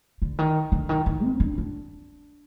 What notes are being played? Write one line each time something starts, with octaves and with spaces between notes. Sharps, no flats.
D3
D#3
D3
D#3
D#3
C4
D4
D4